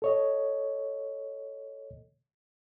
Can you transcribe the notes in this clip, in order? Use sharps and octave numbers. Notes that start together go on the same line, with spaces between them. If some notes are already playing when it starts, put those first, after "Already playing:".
A4 C#5 D#5